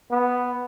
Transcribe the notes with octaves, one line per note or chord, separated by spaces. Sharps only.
B3